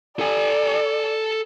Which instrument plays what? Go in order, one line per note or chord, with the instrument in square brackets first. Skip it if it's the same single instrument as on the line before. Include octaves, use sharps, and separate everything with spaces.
[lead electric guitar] A4 G#5 [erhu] D5